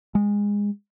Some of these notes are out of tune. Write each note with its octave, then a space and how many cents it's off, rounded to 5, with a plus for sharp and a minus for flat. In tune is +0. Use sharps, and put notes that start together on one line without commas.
G#3 -20